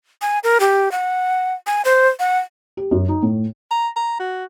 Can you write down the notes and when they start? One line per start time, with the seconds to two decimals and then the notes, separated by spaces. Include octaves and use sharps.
0.22 G#5
0.44 A#4
0.60 G4
0.92 F#5
1.67 G#5
1.85 C5
2.19 F#5
2.77 G4
2.91 F#2
3.08 D#4
3.23 A2
3.71 A#5
3.96 A#5
4.20 F#4